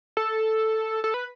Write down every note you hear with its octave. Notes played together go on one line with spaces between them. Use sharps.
A4
A4
B4